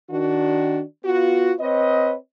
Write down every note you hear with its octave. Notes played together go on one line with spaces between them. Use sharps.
D#3 D4 F#4
B3 F4 F#4
C4 B4 C#5 D#5